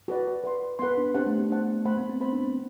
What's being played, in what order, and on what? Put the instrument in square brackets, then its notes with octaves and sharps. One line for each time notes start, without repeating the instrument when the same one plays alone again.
[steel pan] F#4 B4 D5
B4 F#5 C6
[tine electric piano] B3 [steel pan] C6
[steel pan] B4 F#5
[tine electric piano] D4
[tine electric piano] C4 [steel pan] D4 G4 C5 F#5 A5
[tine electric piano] A3
B3
[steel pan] D4 G4 C5 F#5 A5
[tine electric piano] A3 [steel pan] C5 F#5 B5
[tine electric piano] B3
C4
[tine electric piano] C4 [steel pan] C5 F#5 B5
[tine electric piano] D4
C4